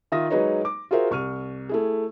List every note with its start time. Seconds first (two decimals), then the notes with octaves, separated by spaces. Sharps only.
0.12 D#3 F4 E5 D#6 A#6
0.30 F#3 G#3 D#4 B4 C#5 D#5
0.65 D6
0.91 F4 F#4 G#4 A#4 C5 E5
1.11 C2 C#6 F6 D#7
1.69 A3 E4 G#4